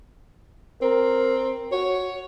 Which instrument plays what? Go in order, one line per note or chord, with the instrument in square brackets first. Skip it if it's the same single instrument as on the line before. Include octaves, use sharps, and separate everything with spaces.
[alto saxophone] C4 [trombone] A#4
[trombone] F#4 [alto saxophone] C#5